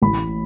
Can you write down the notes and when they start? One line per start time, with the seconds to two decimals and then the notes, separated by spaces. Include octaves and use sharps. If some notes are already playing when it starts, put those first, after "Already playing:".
0.02 A1 A2 E3 B5